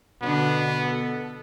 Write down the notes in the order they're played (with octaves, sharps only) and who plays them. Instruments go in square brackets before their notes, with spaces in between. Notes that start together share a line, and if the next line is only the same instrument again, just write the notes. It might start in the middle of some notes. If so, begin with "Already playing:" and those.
[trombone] B2 [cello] D3 D4 [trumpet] B3
[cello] A4